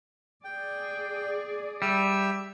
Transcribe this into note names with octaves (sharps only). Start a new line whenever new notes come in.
G#4 D5 G5
G3 E5 E6